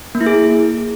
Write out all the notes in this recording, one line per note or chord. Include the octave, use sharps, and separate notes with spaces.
A#3
E4
G#4